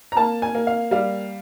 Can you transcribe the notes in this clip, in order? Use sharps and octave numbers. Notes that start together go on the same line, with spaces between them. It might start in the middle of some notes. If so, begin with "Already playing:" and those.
A#5
A#3 A5
G#5
A#3
F5
G3 F5